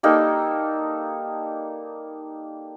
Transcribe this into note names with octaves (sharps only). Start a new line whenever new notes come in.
G3 A#3 D#4 A4